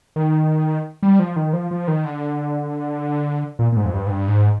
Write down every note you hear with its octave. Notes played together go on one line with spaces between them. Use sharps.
D#3
G3
F3
D#3
F3
F3
D#3
D3
A#2
A#2
G#2
F2
G2
G#2
G2
G#2